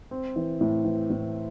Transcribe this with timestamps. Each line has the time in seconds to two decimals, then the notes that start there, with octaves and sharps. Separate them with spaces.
0.11 C4
0.36 E3
0.61 A2
0.85 E3
1.10 A2